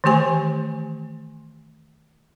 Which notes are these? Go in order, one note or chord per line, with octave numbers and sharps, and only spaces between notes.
D#3 E3 A3 G4 G#5